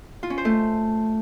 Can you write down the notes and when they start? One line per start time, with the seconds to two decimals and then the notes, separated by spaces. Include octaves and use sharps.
0.23 F4
0.30 C#4
0.38 C5
0.45 A3